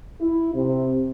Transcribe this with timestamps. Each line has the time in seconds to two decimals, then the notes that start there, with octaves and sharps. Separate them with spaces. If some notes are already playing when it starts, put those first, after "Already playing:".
0.20 E4
0.54 C3